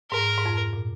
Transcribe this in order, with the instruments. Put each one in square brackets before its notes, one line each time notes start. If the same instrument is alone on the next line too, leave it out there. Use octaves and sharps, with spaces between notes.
[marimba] G#2 [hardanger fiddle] A#4
[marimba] G#2
F2
A#2